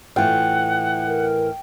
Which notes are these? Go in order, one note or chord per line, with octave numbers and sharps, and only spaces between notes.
A2 E3 F4 F#5 G5
A#4